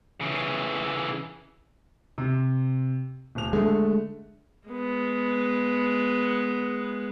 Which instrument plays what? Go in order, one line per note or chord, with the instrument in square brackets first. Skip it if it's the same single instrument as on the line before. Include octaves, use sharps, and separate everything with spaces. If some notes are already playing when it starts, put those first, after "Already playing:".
[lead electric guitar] C#3 E3
[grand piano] C3
D1 F7
[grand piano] D3 A3 [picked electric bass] G#3
[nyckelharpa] G#3 B3